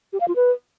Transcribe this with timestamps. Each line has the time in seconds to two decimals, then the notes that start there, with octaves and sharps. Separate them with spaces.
0.13 G4
0.20 F5
0.28 F4
0.36 B4